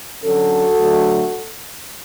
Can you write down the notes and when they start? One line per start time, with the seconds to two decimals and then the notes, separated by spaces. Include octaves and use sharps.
0.23 D3 F#3 C#4 F#4 A4
0.78 D3 F#3 A3